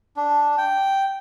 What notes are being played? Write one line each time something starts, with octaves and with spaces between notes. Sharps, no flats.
D4
G5